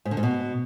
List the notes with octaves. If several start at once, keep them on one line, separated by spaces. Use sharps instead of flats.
G#2
D3
G#2
B2